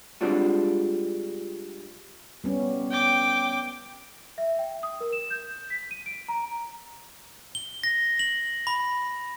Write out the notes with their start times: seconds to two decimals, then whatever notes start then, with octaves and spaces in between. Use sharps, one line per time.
0.21 G3 G#3 C4 D4 F4 F#4
2.44 G3 B3 C#4
2.91 G5 D6
4.38 E5
4.59 G5
4.83 D#6
5.00 A#4
5.13 E7
5.30 G6
5.70 B6
5.91 D#7
6.06 D7
6.28 A#5
7.55 G7
7.84 A#6
8.19 F#7
8.67 B5